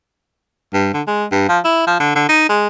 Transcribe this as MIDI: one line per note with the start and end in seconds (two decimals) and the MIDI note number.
0.73 0.90 43
0.93 1.02 50
1.07 1.25 56
1.31 1.45 43
1.49 1.59 53
1.65 1.84 64
1.87 1.97 53
2.00 2.11 50
2.15 2.26 50
2.28 2.46 63
2.49 2.67 56